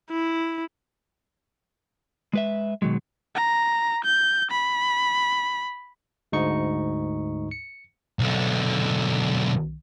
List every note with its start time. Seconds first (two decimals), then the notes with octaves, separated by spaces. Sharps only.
0.10 E4
2.33 G#3 B4 E5
2.82 B2 D#3 F#3 G#3
3.35 A#5
4.04 G6
4.50 B5
6.32 D2 G#2 D#4 C#6 C#7
7.51 C#7
8.19 B1 D3